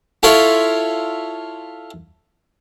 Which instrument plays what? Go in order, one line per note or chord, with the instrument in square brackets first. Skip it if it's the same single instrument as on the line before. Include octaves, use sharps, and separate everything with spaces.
[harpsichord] E4 F4 A4 C#5 E5